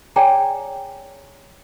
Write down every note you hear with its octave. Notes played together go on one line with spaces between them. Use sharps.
G#4 C#5 D5 G5 G#5 A#5